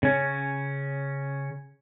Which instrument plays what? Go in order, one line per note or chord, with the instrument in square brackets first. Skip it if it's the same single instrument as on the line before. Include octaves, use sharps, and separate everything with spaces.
[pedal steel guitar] C#3 C#4